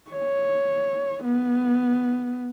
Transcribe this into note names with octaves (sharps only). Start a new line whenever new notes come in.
C#5
B3